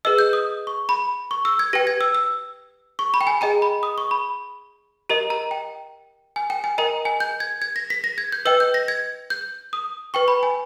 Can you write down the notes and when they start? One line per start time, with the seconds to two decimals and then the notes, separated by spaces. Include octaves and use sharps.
0.05 G#4 B4 D#5 E6
0.19 G6
0.33 D#6
0.67 C#6
0.89 B5
1.31 C#6
1.45 E6
1.59 G#6
1.73 G4 B4 G5 A#6
1.87 G#6
2.01 E6
2.15 E6
2.99 C#6
3.14 B5
3.21 G5
3.27 G#5
3.41 G#4 D#5 G5 A#5
3.62 B5
3.83 D#6
3.98 C#6
4.11 B5
5.09 G4 A#4 D#5 A#5
5.30 A#5
5.51 G5
6.36 G#5
6.50 G5
6.64 G#5
6.78 A#4 D#5 G5 A#5
7.05 G#5
7.20 G6
7.40 G#6
7.62 G#6
7.76 A#6
7.90 B6
8.04 A#6
8.18 G#6
8.32 G6
8.45 B4 D#5 G5 E6
8.60 G6
8.74 A#6
8.88 G#6
9.30 G6
9.73 D#6
10.14 B4 G5 C#6
10.28 B5
10.43 G#5